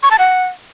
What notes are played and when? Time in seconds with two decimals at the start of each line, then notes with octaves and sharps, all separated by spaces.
0.03 C#6
0.11 A5
0.19 F#5